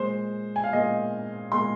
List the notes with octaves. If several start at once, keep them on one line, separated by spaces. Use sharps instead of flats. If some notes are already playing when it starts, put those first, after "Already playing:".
Already playing: A#2 G#3 C5
G#5
F5
A#2 G#3 D#5
A#2 G#3 C6